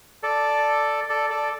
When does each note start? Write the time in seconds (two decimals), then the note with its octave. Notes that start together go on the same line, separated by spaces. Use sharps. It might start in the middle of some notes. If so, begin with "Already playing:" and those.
0.23 A4 D5
1.09 A4 D5
1.30 A4 D5